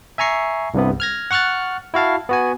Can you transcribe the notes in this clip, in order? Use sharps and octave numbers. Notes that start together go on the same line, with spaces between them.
E5 G#5 A#5 C#6 C7
C2 G2 C3 B3
F6 G#6 A#6
F#5 C#6 F6 F#6 A6
E4 F#4 F5 A5
B3 F#4 G#5